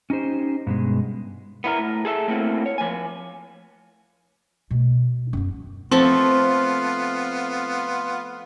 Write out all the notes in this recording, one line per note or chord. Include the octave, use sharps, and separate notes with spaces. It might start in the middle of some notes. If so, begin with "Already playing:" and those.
C#4 D#4 G4 C5
G2 B2 G#3
B3 E4 A#4
A2
G#4 A4 C5 E5
A3 A#3 C4 C#4 E4 F#4
C#5
F3 G#5
B2 A3
F#2 B3
F3 A3 B3 C4 F4 A5 C6